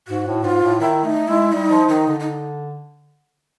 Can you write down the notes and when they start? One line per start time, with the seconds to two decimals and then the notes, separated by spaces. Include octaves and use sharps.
0.08 G#2 F#4
0.27 A2
0.44 G#2 F4
0.63 A2
0.80 D#3 E4
1.04 A3 D#4
1.28 G#3 E4
1.52 G3 D#4
1.71 F3
1.88 D#3 D#4
2.07 D3
2.20 D#4